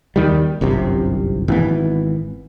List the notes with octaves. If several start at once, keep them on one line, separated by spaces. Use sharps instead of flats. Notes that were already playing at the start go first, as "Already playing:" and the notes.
D#2 D#3 G3
G1 C2 F#2 C3
G#1 E3 B3